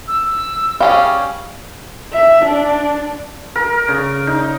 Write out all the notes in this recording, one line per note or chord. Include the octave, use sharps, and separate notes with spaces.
E6
G3 C#4 G#4 F5
E5
D4
A#4
C#3
D#4